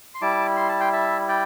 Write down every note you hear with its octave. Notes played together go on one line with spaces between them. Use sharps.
C6
G3 E4 A5 D6
C6
A5
G5 C6
E5 A5
D5 G5